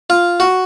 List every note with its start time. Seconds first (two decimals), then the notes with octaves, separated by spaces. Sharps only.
0.10 F4
0.40 F#4